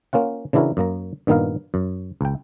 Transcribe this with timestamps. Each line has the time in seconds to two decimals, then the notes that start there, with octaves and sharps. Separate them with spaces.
0.13 A#3 C#4 F4 F#5
0.53 C#3 E3 D4 E4 F#4 A#4
0.77 F#2 A#3 A#5
1.27 G2 A#2 D#3 B3 A#4 F5
1.74 F#2
2.21 C#2 G5